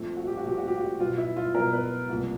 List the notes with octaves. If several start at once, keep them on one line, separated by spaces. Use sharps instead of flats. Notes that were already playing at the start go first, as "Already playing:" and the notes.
Already playing: A#2 F3 A3 C4
F#4
G4
F#4
A#2 F3 A3 C4 G4
F#4
G4
F#4
B2 F#3 B3 F4
E4
F4
B2 F#3 B3 A#4
B4
C2 A#2 F3 A#3